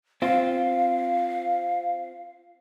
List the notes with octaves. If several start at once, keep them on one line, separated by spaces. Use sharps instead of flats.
C4 F4 F5